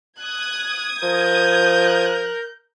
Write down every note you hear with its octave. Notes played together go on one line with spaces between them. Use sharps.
D#6 F#6 G#6
F3 A#4 G6